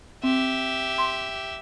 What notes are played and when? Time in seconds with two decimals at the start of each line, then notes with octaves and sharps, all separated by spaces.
0.24 C4 G4 E5
0.98 C6